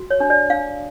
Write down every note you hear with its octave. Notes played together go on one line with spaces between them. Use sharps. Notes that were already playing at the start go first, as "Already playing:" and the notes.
Already playing: F#4
C#5
D4
D5
D4 F5